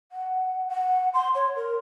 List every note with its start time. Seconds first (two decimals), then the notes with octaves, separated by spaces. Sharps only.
0.12 F#5
0.69 F#5
1.14 C6
1.35 C#5
1.56 A#4